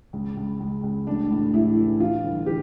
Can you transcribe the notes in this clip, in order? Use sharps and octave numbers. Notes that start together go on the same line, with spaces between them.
C#2
C#2
C#2
C#2
A1 D4
A2
A1 E4
E3
E3 F4
G1
E3 G4